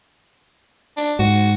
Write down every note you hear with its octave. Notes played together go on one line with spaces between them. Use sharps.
D4
G#2 F#4